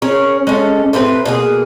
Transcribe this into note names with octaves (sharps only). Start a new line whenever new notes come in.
C#4 G#4 A#4 C#5
G#3 A3 C#4
A2 C4 G4 B4
B2 A#3 G#4